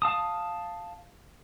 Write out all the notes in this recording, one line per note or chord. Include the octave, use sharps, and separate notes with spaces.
F5 A5 D#6